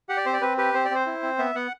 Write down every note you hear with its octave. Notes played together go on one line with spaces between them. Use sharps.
G4 F#5
D5
C4 C5
D5
C4 B4
G4 B4
C4 C5
D5
C4 C5
E4
C4
B3 E5
B3 F#5